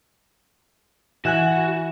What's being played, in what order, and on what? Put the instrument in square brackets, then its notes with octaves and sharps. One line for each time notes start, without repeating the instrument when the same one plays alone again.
[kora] E3 [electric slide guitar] F#4 [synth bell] G#5 F#6 E7